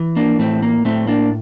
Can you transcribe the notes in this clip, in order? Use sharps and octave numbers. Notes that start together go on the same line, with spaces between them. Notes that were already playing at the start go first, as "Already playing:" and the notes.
Already playing: E3
A#3 D4
A2 A3 C4
A#3
A2 A3 C4
A#3 D4